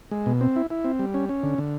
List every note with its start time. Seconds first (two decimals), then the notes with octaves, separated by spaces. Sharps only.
0.11 G#3
0.26 B2
0.41 C4
0.56 E4
0.70 E4
0.84 C4
0.99 G3
1.14 C#4
1.29 C#4
1.43 D3
1.58 D3